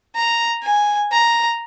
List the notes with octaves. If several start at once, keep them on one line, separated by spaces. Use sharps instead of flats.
A#5
G#5
A#5